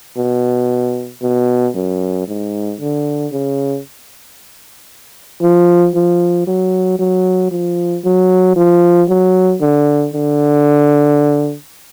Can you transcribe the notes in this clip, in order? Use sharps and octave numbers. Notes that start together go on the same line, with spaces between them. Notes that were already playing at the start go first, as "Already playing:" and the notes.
B2
B2
F#2
G#2
D3
C#3
F3
F3
F#3
F#3
F3
F#3
F3
F#3
D3
D3